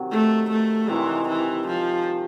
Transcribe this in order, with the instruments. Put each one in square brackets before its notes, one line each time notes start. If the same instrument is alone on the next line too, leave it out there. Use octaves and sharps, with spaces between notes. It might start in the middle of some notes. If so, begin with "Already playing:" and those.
Already playing: [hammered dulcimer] C3 D#3 F#3
[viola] A3
A3
[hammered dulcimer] C3 D#3 G#3 [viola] E3
[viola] E3
F3